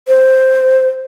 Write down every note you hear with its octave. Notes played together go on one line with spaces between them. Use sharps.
C5